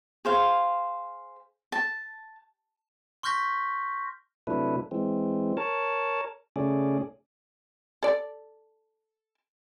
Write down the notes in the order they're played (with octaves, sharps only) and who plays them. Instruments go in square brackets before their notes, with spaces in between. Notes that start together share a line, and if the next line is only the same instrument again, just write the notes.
[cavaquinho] G#4 C5 F5
A5
[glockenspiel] C6 C#6 F6 G6 A#6 B6
[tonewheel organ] C3 F#3 A3 D4 E4 B4
E3 G#3 C4
A#4 C#5 A5
C#3 A3 C#4 G#4 D5
[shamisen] A4 D5